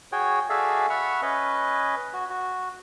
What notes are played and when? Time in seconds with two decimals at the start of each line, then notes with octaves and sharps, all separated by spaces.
0.12 F#4 G#4 C#5 G5
0.50 F#4 G#4 A4 D5 E5 F5
0.90 E5 F#5 B5 C#6 F6
1.22 C#4 B4 D#5
2.14 F#4
2.30 F#4